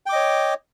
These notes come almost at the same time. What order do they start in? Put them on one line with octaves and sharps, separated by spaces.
G5 D6 D#5 C#5